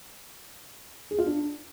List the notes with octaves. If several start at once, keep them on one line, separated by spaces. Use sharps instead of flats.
G#4
F4
D4